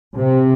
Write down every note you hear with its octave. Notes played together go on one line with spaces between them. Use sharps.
C3